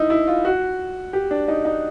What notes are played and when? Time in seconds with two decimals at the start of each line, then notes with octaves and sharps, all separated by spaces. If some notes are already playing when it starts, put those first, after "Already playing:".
Already playing: D#4 E4
0.10 E4
0.27 F4
0.45 F#4
1.13 G4
1.31 D4
1.48 D#4
1.65 D#4